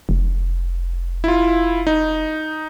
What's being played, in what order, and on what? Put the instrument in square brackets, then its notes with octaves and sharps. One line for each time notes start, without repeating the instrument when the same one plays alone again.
[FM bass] F1
[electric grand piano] E4 F4
D#4